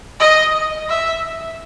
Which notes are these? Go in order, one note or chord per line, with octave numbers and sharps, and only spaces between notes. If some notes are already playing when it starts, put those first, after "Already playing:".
D#5
E5